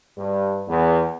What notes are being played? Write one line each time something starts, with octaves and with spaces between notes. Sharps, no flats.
G2
E2